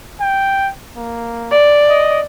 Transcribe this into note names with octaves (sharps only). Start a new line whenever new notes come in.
G5
A#3
D5
D#5